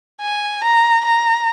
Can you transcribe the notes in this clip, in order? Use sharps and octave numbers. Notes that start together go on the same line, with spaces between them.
G#5
A#5
A#5